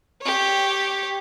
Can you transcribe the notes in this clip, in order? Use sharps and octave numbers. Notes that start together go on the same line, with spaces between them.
G4 C#5